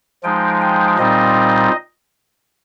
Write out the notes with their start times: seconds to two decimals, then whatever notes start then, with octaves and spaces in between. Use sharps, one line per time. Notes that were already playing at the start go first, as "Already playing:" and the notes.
0.23 F3 G#3 D#4 G5
0.61 G5
0.98 A#2 G3 C4 D#4 D#5